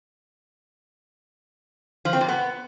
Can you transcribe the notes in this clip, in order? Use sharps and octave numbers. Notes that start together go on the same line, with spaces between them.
F3
C4
A#2
B3